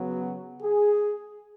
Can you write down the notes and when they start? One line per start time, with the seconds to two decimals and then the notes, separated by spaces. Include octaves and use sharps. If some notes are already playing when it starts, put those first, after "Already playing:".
Already playing: C#3 F#3 B3
0.19 F#4
0.61 G#4